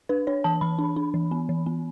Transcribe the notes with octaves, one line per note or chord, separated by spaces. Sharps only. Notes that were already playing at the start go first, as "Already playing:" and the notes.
D4 B4
D4 C#5
E3 A5
E3 B5
D4
D4
E3
B3
E3
B3